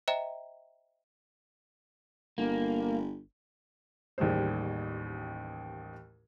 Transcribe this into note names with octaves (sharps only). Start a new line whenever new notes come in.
C5 D#5 E5 G5 A#5 E7
G1 A#3
A1 D#2 G3 G#4 C5